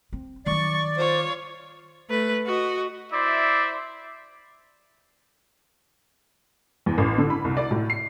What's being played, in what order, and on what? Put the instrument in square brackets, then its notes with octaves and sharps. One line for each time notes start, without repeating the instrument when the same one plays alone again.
[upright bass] C4
[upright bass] D#3 F#3 [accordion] D5 [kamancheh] C#6
[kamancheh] F4 C#5 [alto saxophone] C5
[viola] A3 B4
F#4 D#5
[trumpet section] E4 C5 D5 E5
[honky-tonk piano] E2
A1
D3
B5
C2
D5
A2
C7